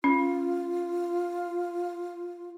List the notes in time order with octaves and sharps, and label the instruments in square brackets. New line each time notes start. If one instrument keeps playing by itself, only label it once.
[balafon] C#4 [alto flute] F4